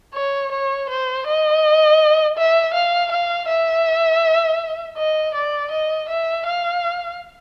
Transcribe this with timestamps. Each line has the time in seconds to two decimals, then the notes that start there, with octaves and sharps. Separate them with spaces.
0.15 C#5
0.51 C#5
0.89 C5
1.27 D#5
2.38 E5
2.74 F5
3.12 F5
3.48 E5
4.98 D#5
5.34 D5
5.71 D#5
6.09 E5
6.46 F5